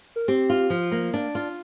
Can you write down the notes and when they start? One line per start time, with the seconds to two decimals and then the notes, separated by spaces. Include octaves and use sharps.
0.16 A#4
0.28 C4 G4
0.50 F4
0.70 F3
0.92 A#3
1.14 D4
1.35 F4